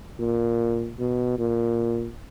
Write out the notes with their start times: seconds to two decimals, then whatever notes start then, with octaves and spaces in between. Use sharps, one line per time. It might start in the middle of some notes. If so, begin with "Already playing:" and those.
0.20 A#2
0.99 B2
1.39 A#2